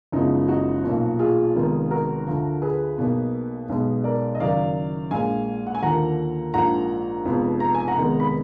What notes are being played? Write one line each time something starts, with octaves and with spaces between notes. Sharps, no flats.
F#1 F#2 F3 G#3 B3 D#4
D#4 F#4
B1 A#2 F3
F4 G#4
F1 F2 D#3 G#3 B3
F#4 A#4
D2 D3 F3
G#4 B4
B1 B2 A#3
B1 B2 G#3 B3
A#4 D5
D#5
F#1 F#2 D#3 F#3 D5 F5
A#1 A#2 G#3 F5 G#5
F#5
G#5
D#2 D3 F3 A#3 F#5 A#5
A#1 G#2 F3 A#3 F#5 A#5
F1 F2 F3 G#3 B3
A#5
G#5
F#5 A#5
F1 F2 D#3 G#3 B3
B5